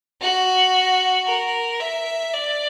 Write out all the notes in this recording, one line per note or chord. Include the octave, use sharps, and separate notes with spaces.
F#4
A#4
E5
D5